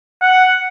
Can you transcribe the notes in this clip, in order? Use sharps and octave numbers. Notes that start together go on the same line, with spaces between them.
F#5